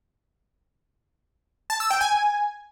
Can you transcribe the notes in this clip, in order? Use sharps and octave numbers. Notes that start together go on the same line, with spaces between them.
A5
E6
G5
G#5